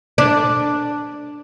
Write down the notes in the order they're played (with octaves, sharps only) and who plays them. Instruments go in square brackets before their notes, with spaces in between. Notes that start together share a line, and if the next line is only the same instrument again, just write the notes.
[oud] D4